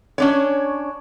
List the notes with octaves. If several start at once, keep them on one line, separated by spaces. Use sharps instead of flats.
C#4 D4 C#5